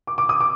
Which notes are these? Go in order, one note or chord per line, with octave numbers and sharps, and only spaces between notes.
D6
D6
D#6
D6